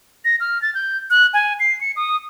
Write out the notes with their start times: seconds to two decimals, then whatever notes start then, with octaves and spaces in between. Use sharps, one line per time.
0.25 A#6
0.40 F6
0.62 A6
0.74 G6
1.10 F#6
1.34 G#5
1.60 C7
1.81 C#7
1.96 D#6